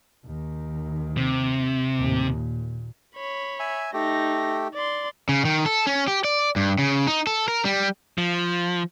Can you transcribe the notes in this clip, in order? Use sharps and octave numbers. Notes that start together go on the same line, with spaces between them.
D#2 D#3
C3
D#2 A2
A#2
C#5 B5
E5 G#5
A3 D#4 G4 A#6
D5 C6
C#3
D#3
A4
C#4
G4
D5
G2
C#3
D#4
A4
A#4
G3
F3